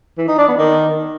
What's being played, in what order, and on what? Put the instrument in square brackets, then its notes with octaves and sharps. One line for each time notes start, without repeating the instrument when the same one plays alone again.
[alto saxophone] E3
D#4
D4
B3
D#3